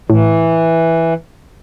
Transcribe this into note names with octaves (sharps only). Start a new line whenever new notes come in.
A2 E3